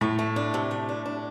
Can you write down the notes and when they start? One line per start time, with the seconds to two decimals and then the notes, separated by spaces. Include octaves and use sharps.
0.01 A2 A3
0.19 A3
0.36 D4
0.54 C3
0.71 A3
0.89 D4
1.06 D4